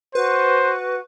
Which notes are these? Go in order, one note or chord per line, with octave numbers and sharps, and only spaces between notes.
F#4 B4 C5